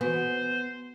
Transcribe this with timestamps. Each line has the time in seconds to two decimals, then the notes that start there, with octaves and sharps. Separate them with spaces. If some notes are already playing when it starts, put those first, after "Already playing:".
0.01 E3 B3 F#4 C5 G#5